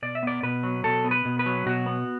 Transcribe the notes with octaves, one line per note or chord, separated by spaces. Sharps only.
B2 D5
E5
B3 D5
B2 B4
F#3
B2 A4
B3
B4
B2
B4
F#3
B2 F#4
B3